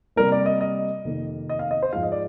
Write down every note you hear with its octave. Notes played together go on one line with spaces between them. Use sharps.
C3 G3 A#3 A#4
D5
D#5
D#5
F2 C3 D#3 A#3
D#5
F5
D#5
C5
G#2 F3 G#3 F5
D#5
D5